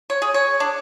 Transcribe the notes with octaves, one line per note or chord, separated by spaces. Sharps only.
C#5
G#4
C#5
D4